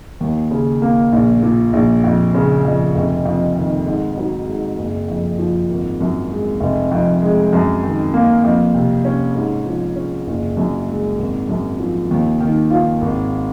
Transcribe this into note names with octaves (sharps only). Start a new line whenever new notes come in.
D#2
C#3
A#3
A#1
A#2
A#1
F2
C#3
F2
F1
F2
D#3
G#2
F#3
G#2
F#1
F2
F3
G#1
F#2
G#3
F1
F2
G#3
F#2
D#3
A#3
F2
C3
C#4
G#2
F3
C#4
F#1
F#2
G#3
G#1
F#2
F3
D#2
D#3
F4
G#1